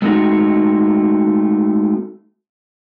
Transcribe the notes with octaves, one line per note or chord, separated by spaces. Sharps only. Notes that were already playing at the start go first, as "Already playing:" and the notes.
G#3 A3 C4 D#4 F#4